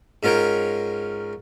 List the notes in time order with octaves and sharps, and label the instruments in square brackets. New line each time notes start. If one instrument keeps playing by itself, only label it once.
[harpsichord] G#2 C#4 F4 A#4 C#5 G5